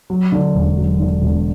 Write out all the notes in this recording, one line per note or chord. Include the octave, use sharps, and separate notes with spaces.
F#3
D3
E1
F#3
D3
E1